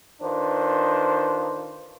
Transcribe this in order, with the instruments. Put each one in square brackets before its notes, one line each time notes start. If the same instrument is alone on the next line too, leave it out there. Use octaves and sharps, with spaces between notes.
[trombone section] D#3 D4 F4 B4 C5